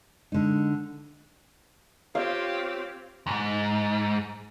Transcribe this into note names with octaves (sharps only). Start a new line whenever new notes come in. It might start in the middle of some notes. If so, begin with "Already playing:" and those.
D3 G#3 D#4
C4 F4 G4 C5 C#5 F5
E2 G#2